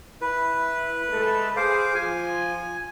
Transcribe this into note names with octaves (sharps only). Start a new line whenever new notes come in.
E4 B4
G#3 A3 A4
G#4 C5 F5 D6
F3 F4 G#5